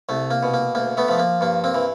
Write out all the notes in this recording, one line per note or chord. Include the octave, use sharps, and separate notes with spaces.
C2 A3
A#3
B2
A#3
D2 A#3
A3 B3
F3 A3
A#3
G2 A#3
A#3 C4
E3